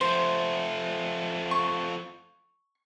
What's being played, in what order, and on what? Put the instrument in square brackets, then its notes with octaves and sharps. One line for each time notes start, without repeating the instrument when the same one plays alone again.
[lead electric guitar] F3 A3 [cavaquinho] C5
[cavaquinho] C#6